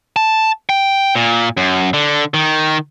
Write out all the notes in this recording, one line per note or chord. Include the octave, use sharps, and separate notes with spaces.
A5
G5
A#2
F#2
D3
D#3